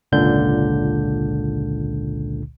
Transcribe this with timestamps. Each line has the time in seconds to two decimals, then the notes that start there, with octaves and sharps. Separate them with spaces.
0.12 G#1 C#2 A#2 D3 G6